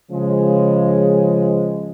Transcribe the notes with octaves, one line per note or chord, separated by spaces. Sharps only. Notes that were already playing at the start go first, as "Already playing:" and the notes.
C#3 F3 G#3